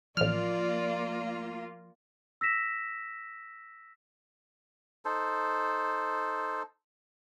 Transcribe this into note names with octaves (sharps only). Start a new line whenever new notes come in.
A1 F3 A#3 F4 D5 F6
E6 A#6 B6 E7
D#4 A4 C5